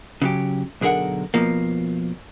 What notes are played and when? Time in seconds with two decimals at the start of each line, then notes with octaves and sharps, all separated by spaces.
0.22 C#3 F#3 G4
0.81 B1 D3 G#4 A#4 F#5
1.34 F2 B2 F3 A#3